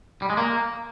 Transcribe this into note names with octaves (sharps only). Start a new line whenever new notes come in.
G3
G#3
A#3